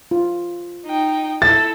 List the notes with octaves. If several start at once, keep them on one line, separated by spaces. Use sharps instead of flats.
F4
D#4 G5
E4 A4 A6